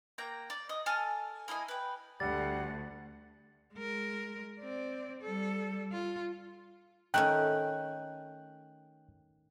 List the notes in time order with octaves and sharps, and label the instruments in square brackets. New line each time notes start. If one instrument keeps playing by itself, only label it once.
[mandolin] A#3 G5 A#5
D5
D#5
A4 G#5 A5 F6
A#3 E4 D#5 G#5
B4 G5
[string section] D2 [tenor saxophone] G3 [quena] F#5 [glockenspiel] A6
[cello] G#3 A#4
C4 D5
G3 A4
F4
[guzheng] D#3 A3 C#4 [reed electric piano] G5 F#6